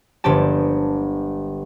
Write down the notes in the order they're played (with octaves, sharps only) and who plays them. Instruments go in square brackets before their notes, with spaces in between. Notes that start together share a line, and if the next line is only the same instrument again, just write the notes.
[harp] G1 F3 G#3 G4 A5